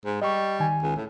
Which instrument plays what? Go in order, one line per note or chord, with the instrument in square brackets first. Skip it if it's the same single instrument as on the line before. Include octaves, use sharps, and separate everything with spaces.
[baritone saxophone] G#2
[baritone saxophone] G3 [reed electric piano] D#5 C#6
[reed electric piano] D#3 G#5
[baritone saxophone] C#2
A2